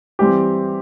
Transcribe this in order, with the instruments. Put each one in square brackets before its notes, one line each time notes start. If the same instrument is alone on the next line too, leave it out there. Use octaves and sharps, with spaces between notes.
[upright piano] E3 G3 C4 G4